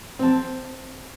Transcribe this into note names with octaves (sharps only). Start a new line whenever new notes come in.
C4 A5